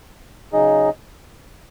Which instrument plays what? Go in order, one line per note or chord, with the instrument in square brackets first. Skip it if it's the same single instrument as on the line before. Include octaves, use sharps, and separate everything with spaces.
[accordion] C#3 F#3 D#4 G#4 D#5